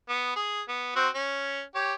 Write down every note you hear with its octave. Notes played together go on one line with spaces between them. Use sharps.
B3
G#4
B3
C4 F#4 C5
C#4
G4 C#5